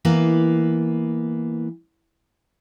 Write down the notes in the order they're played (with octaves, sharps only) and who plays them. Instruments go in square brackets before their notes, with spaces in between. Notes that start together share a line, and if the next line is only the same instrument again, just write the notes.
[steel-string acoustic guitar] E3 A#3 B3